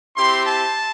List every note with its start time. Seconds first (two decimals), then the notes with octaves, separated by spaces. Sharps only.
0.17 C4 E4 G4 C6
0.47 A5